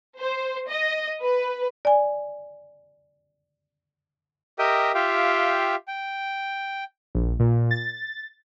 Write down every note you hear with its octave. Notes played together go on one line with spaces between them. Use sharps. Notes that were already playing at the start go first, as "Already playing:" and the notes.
C5
D#5
B4
D5 G#5
G4 A#4 D#5 E5 G5 D#6
F4 G4 E5 F5 G5
G5
A#1
A#2
A6